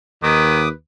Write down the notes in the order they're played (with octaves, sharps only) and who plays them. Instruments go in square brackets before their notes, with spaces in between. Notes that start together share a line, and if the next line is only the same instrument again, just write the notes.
[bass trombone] D#2 [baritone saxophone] D#3 [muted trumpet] B4 [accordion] D6 D#6